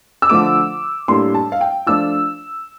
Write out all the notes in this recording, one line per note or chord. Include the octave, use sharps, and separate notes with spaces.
E6
D3 F3 A3 D6
A2 G3 A#3 D4 C6
A5
F5
G5
F3 A3 D4 F4 E6